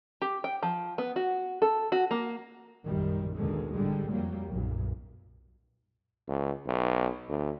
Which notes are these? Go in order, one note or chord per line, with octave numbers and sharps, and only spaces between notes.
G4
G5
F3
B3
F#4
A4
F#4
A#3
A#1 F#2 D#3 G3
D#2 B2 D3 D#3 G#3
G#1 D3 G3 G#3
F2 F#3 G3 A#3
B1 F#2 A#2
C#2
B1
D2